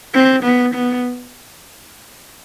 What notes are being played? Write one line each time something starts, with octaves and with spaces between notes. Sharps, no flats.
C4
B3
B3